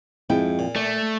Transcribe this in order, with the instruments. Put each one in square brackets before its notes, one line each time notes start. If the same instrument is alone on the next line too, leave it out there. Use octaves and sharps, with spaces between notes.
[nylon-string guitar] F2 E4 G5 [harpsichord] G#2
[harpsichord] A#2
[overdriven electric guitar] A3 [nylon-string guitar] D5